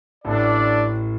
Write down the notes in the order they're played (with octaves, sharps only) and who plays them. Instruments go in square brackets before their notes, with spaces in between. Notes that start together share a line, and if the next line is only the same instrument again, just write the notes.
[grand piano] A1 A2 [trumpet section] D4 A4 D5